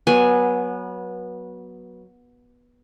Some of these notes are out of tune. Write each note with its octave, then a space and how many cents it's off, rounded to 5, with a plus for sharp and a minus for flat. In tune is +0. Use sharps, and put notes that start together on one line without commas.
F#3 +0 B3 -20 G#5 +0